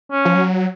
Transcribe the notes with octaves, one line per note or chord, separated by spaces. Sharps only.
C#4
F3
F#3